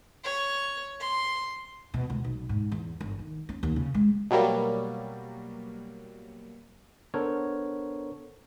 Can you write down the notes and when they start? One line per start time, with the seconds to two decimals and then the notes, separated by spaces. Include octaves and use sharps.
0.24 C#5
1.00 C6
1.94 B2
2.10 C#2
2.24 B1
2.49 G#2
2.72 E2
3.01 G1
3.19 D#3
3.49 C#4
3.63 D#2
3.76 C#3
3.94 G#3
4.31 B2 F#3 G3 A#3
7.14 B3 D4 A4 A#4 C5 C#5